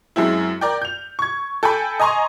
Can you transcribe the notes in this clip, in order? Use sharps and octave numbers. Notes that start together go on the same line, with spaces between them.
F#2 G#3 C4 E4
A#4 D5 G5
G6 F7
C#6 G#6
A4 G5 G#5 B5
D#5 G#5 A#5 C6 C#6